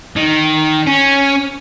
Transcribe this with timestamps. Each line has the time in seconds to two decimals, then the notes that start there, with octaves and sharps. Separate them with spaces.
0.16 D#3
0.87 C#4